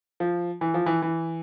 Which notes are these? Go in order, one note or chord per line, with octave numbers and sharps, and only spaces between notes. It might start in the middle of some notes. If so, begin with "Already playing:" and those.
F3
E3
F3
E3
E3